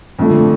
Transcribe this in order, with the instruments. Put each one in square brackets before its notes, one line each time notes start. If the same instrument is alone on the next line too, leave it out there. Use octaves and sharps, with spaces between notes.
[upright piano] F2 D3 F3 A3